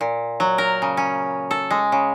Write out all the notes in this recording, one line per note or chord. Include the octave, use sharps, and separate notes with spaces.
A#2
F#3
A#4
C#3
C#4
A4
G#3
C#3